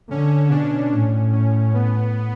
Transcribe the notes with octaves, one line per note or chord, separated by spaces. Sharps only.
D3 C#4
B2 D4
A2 C#4
C#4
B3